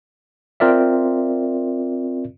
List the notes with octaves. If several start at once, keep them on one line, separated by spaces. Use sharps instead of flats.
C4 F4 A#4 D5 E5